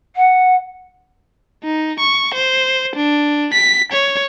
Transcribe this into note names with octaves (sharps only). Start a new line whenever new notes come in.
F#5
D#4
C#6
C5
D4
B6
C#5